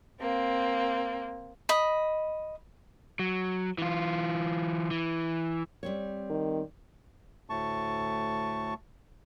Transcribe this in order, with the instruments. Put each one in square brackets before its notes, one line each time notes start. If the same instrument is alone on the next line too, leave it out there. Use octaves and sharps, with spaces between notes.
[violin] A#3 C4
[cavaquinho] D#5 B5
[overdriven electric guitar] F#3
E3 F4
E3
[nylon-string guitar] G3 C4 C#5
[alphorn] D#3
[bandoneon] D2 A2 A3 A5 C#6